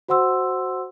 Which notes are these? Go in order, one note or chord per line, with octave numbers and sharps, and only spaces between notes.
F#4 C5 F#5 C6 E6